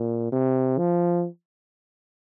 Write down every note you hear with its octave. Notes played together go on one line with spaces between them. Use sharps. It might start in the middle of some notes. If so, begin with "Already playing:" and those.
Already playing: A#2
C3
F3